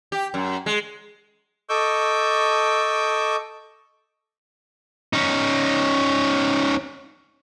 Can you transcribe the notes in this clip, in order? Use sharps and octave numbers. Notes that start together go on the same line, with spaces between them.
G4
F#2
G#3
A4 D#5 C#6 D6 E6 G6
C#4 D#4